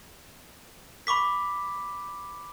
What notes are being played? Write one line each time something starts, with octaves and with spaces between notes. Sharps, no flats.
B5 C#6 D6 B6